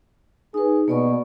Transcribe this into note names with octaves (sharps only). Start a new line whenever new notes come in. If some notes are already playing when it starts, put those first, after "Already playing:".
D#4 G#4 B4
B2 A#3 D5 C#6